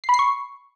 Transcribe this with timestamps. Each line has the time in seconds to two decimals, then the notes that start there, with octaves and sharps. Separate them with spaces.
0.04 C7
0.09 B5
0.14 C7
0.19 C#6